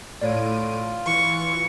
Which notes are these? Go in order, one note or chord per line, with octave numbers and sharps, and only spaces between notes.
A2 F4 C#5 D5 D7 D#7
E3 C#6